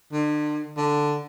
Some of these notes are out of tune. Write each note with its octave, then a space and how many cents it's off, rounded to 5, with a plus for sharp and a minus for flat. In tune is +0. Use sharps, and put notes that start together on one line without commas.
D3 +35
D3 +5